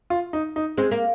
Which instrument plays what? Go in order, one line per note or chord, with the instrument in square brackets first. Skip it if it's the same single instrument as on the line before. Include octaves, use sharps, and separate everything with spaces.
[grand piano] F4
D#4
D#4
[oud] G#3 [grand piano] C4
[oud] A#3